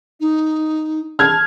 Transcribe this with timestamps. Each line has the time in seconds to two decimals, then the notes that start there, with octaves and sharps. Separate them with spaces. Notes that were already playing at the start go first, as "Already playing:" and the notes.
0.20 D#4
1.19 A5 F6 G#6